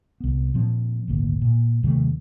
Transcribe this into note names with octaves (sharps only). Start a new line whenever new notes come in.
C2 B3
A#2 F3 C4
D#1 G#1 D2 A#3
A#2
D#2 C3 F#3 A3